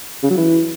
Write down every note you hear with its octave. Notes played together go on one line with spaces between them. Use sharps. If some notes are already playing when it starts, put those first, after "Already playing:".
C#3
F#3
E3